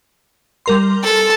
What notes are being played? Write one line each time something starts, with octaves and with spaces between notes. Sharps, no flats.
G3 A#4 C6
A4 A5